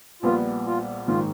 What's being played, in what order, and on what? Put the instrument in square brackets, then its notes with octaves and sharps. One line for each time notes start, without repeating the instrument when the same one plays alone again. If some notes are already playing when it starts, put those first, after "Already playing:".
[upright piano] A#1 A#2 G3 B3 [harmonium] F4
[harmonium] F4
[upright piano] A#1 G#2 D#3 [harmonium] F4